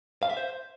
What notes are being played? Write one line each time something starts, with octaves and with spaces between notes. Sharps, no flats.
F5
E5
C5